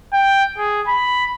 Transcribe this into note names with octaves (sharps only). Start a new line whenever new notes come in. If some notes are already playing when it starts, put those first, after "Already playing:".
G5
G#4
B5